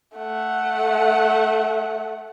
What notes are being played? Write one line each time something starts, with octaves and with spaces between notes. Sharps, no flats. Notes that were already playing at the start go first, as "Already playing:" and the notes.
A3 F#5